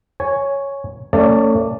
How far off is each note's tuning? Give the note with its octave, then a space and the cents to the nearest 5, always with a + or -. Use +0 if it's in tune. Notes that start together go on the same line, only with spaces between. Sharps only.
C#5 +0 G#5 +0
A3 +40 C#4 +0 D5 +0